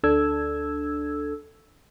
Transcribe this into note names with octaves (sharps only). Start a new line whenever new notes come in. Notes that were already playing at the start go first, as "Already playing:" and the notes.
D2 D4 A4 E6 G#6